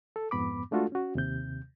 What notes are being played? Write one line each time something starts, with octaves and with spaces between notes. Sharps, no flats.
A4
F2 G#2 B3 B5 D6
G#3 A3 D4 F4 F#4 A4
C#4 F#4
D#2 C3 G6